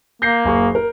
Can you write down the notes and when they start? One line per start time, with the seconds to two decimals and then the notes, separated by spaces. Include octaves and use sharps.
0.22 A#3 G6 A#6 C7
0.45 F#1 G#4 C#6
0.75 A#4